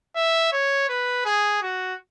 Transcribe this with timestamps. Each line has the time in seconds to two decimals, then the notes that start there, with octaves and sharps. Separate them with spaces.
0.16 E5
0.52 C#5
0.89 B4
1.25 G#4
1.62 F#4